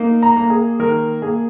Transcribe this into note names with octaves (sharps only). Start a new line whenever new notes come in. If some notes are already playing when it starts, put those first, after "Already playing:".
Already playing: A#3 D#4
A#5
A#3
G#4
D#3 A#4
A#3 G#4